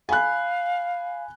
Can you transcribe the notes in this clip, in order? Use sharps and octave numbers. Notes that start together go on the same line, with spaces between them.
F5 G#5 B5 F#6